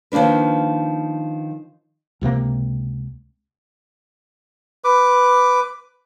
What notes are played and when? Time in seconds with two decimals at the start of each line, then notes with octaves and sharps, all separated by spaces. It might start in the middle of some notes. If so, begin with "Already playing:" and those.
0.12 D#3 F3 A#3 D4 B4
2.21 C#2 C3 F3 A#3
4.84 B4 D6